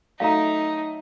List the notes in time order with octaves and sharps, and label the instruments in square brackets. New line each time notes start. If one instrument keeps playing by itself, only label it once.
[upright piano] F#3 A3 E5 [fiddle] D#4 [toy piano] F5 A#5